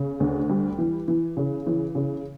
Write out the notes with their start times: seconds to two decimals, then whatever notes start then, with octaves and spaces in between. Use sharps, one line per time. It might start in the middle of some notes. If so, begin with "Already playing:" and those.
Already playing: C#3
0.20 D2
0.49 G3
0.78 E3
1.08 E3
1.37 C#3
1.67 E3
1.95 C#3